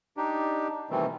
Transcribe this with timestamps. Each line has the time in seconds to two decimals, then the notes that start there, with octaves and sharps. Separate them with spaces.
0.17 D4 D#4 G4
0.90 B2 D#3 E3 G3 A3 C4